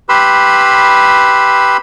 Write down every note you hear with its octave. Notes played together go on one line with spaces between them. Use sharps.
G4 B4 B5 C6 E6